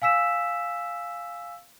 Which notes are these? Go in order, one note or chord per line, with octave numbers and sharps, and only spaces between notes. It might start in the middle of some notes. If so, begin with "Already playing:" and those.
F5 G#5 E6 B6 E7